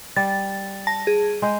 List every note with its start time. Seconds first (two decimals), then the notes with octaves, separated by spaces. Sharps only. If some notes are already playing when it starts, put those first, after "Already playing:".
0.16 G3 A6
0.87 A5 A#6
1.07 G#4
1.42 G#3 G5